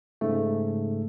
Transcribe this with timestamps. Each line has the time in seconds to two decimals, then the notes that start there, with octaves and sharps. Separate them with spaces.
0.21 G#2 C#3 A3